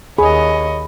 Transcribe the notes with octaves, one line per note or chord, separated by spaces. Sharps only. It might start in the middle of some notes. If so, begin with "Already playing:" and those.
D#2 G#4 C#5 D#5 B5